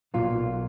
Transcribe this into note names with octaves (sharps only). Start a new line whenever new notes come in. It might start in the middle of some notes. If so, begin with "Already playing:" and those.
B1 A#2 F#3 F4